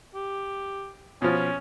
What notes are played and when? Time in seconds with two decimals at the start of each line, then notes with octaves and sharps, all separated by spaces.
0.15 G4
1.22 B2 F3 C#4